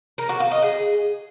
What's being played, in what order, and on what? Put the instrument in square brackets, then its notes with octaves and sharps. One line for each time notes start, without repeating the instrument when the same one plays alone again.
[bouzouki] A#4
F#4
F5
D#5
G#4